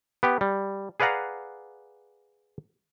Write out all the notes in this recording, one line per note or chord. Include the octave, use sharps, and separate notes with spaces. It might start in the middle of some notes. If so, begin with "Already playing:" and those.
B3 G4
G3
G#4 B4 D5 F5 F#5 A#5